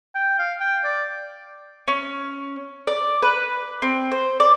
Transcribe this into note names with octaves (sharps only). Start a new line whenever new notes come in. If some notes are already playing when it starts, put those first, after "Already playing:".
G5
F5
G5
D5
C#4
D5
B4
C4
C5
D5